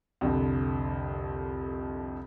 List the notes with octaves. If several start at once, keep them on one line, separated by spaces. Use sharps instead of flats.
C2 F2 D3